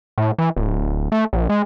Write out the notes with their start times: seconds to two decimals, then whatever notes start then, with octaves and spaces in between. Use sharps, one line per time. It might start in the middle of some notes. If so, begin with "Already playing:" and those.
0.18 A2
0.38 E3
0.56 D1
1.12 A3
1.33 A#1
1.49 G#3